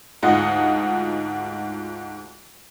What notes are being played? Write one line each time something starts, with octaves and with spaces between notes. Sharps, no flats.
D2 G#2 F4 D#5 F#5 C#7